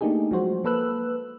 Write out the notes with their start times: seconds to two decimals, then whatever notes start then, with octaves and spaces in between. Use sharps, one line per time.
0.01 A3 A#3 D4 D#4 G4 G#4
0.31 F3 F#3 G#3 F#4 C5
0.64 A#3 A4 B4 E6 F#6